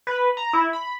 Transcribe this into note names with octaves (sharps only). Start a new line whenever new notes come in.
B4
A#5
E4
B5